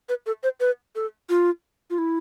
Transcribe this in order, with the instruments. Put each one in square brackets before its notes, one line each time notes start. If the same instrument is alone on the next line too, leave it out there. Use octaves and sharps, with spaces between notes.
[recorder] B4
A4
C5
B4
A4
F4
F4
E4